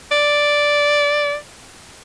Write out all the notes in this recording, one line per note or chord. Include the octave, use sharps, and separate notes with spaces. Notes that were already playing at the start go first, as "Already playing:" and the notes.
D5